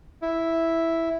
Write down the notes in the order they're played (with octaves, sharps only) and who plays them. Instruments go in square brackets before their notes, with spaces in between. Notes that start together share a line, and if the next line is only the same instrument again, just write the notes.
[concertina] E4